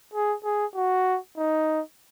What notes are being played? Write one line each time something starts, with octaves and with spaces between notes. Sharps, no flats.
G#4
G#4
F#4
D#4